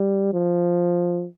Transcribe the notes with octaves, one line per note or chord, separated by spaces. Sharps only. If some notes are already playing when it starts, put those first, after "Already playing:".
Already playing: G3
F3